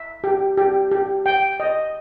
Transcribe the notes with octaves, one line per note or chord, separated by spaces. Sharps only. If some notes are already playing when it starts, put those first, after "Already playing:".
Already playing: E5
G4
G4
G4
G5
D#5